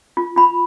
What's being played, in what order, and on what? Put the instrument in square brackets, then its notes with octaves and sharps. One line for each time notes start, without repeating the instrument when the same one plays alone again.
[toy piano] F4
F4 B5